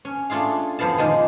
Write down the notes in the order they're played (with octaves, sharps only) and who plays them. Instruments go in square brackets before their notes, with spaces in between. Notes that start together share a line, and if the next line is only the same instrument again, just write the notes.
[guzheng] C#4
A3 D4 F4 G#4 F5
F#2 F3 B3 F5 A5
A#2 D#3 F3 G#3